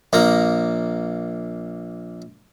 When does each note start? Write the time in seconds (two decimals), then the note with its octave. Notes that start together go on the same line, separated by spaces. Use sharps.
0.13 A#1 A#3 A#5